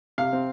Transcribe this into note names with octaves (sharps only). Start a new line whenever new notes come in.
C3 F5
C4